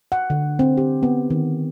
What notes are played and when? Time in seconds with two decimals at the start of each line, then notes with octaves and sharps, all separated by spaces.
0.12 F#5
0.30 D3
0.59 C4
0.77 G4
1.03 B3
1.30 D#3